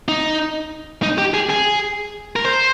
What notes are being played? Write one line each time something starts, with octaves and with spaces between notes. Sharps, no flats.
D#4
D#4
G4
G#4
G#4
A#4
C5